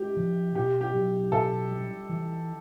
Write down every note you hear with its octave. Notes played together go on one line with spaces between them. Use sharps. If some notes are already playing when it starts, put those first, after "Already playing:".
Already playing: G#3 G4
F3
B2 G4
G4
F#3
B2 A4
G3
E3